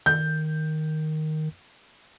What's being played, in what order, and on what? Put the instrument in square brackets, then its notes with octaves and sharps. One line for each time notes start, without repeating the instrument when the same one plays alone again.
[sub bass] D#3 [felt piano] G6